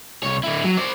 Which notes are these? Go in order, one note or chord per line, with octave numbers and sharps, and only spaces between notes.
C2 C#5
D3 E4
F#3
C5 D5